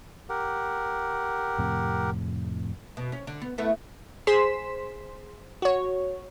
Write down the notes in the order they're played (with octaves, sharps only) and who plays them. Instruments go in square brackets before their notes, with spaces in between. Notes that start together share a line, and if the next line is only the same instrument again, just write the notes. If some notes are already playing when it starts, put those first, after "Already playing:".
[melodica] G4 A#4 F#5
[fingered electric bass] F2 A2 C3
[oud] B2
C#4
D3
B3
A3 B3 E4
[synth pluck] G#4 C5 C6 B6 E7
F#4 C#5